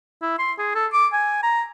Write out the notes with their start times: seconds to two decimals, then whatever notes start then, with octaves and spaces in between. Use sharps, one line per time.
0.22 E4
0.39 C6
0.59 G#4
0.75 A4
0.93 D6
1.13 G#5
1.43 A#5